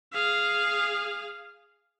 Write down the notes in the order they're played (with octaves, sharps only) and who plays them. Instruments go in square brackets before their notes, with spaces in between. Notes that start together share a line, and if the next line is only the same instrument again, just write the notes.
[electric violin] G#4 F5